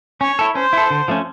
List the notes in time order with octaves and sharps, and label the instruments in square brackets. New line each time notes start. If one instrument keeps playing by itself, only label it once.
[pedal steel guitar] C#4 [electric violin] C#5
[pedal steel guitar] E4 A4
[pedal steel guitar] C#4 [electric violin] C5
[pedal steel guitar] E4 A4
D3
F3 A3 C#4